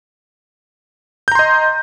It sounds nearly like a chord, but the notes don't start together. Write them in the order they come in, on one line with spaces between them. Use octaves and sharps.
G6 A#5 C6 D#5